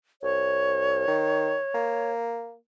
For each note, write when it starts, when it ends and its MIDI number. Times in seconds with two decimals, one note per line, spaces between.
0.22 1.07 36
0.22 2.13 73
1.08 1.56 51
1.74 2.55 58